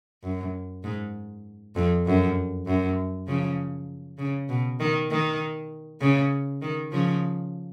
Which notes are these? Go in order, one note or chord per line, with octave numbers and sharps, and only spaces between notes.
F#2
G#2
F2
F#2
F#2
C#3 F3
C#3
B2
D#3
D#3
C#3
D#3
C#3 F3